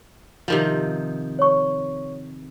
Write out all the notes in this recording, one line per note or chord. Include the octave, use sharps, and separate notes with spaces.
C3 D#3 F3
C#5 C#6